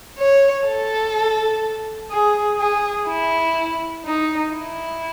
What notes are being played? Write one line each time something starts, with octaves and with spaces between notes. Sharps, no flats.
C#5
A4
G#4
G#4
E4
D#4
E4